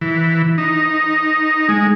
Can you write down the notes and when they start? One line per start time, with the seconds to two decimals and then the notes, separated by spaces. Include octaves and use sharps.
0.01 E3
0.58 D#4
1.69 G#3